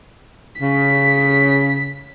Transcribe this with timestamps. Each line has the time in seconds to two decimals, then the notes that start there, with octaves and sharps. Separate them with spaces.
0.61 C#3 B6